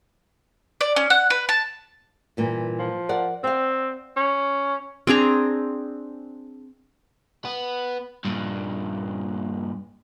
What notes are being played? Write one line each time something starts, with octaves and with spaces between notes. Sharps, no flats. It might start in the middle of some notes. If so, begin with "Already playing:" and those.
D5
C#4
F#5
B4
A5
G2 A#2 E3
F3
A#4 D5 F#5
C4 F5 G5
C#4
C4 D4 G#4 A#5
B3
G2 A#2